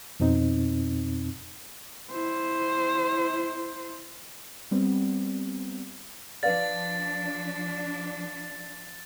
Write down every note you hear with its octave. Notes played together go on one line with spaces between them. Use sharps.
F2 B2 C4 D#4
E4 C5
G3 B3 C4
F3 D4 B4 D5 F5 A6